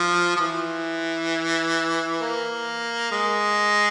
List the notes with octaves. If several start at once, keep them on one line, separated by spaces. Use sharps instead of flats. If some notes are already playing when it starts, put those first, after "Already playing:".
Already playing: F3
F3
E3
A#3
G#3